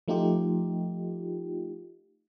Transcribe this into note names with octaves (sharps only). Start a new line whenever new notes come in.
F3 A3 D#4 F4 G4